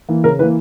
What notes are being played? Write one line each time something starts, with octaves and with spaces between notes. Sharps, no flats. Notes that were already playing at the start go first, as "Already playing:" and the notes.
E3 A#3
C#3 A#4
E3 A#3 B4